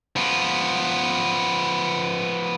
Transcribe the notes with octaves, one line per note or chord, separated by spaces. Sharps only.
F3 B3